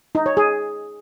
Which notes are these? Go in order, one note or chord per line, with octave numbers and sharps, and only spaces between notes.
D#4
C#5
G#4